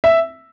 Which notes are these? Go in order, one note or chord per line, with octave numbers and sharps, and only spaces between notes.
E5